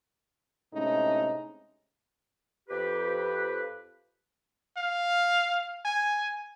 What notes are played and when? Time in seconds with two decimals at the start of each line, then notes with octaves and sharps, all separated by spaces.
0.72 A2 C3 G#3 C#4 D#4
2.69 F2 G4 B4
4.77 F5
5.85 G#5